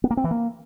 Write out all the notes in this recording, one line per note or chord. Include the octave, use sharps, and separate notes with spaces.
B3
A#3
C4
E3
A#3